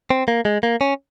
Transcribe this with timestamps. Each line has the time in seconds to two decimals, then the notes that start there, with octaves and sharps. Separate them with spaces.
0.10 C4
0.28 A#3
0.45 G#3
0.63 A#3
0.81 C#4